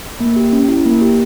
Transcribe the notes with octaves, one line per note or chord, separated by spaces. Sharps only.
A#3
G4
C#4
E4
A#3
G4